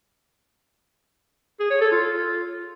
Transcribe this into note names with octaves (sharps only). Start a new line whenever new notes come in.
G#4
C#5
A4
F4